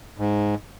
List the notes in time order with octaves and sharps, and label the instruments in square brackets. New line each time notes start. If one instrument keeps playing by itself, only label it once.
[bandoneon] G#2